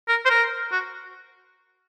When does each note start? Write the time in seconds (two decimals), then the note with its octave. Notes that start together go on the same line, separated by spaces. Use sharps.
0.09 A#4
0.26 C5
0.30 A#4
0.72 F#4